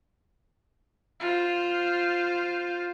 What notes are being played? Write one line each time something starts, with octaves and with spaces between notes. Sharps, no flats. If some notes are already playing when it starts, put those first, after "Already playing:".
F4 C5